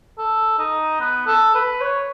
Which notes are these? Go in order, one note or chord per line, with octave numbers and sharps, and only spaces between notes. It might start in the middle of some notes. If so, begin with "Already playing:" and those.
A4
D#4
B3
A4
B4
C#5